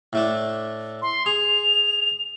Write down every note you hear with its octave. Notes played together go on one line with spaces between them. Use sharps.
A2 A3 D4
C6
G#4 F7